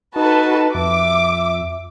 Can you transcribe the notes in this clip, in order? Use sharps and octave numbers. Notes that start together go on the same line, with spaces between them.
D#4 F#4 A4 B4 A5
F2 E5 D6